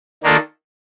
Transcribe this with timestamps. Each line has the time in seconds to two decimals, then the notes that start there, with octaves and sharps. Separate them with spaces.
0.23 D#3 A#3 D4 F4 A4